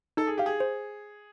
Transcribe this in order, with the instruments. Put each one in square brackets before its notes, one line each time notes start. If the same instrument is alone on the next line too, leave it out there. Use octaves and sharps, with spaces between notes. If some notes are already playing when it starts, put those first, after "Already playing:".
[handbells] D#4 [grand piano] A4
[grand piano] G#4
[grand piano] G4 [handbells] F5
[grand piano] G#4
[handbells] C5